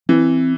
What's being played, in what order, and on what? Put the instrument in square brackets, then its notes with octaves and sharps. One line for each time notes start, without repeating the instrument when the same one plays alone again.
[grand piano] E3 [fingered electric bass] C4